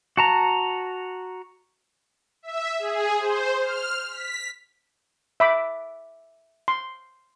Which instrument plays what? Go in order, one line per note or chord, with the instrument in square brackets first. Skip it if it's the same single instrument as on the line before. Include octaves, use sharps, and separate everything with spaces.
[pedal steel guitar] F#4 A5 A#5
[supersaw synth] E5
G#4
C5
F6
B6
[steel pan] E5 B5 D6
C6